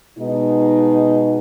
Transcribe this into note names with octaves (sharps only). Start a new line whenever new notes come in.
B2 G#3 D#4